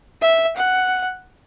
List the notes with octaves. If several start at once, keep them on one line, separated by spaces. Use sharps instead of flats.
E5
F#5